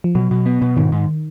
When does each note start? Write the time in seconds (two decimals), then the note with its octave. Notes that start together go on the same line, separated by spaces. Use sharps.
0.04 F3
0.15 B2 F#3
0.31 B2
0.46 B3
0.62 B2
0.77 G#2 D#3
0.92 G#2